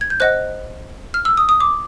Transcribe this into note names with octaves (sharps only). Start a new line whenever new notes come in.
G#6
G6
C5 D#5 F#5 F#6
F6
E6
D#6
D#6
D6